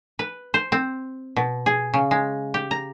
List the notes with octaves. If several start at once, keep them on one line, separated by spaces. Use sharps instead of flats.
B4
C5
C4
B2
G#4
C#3
G#3
G4
A#5